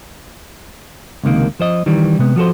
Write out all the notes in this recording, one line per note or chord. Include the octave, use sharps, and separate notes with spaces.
C#2 C3 D#3 A#3
F3 C5 D#5
D#3 E3 G3
C3 G#3 B3
F3 F#4 A4 C5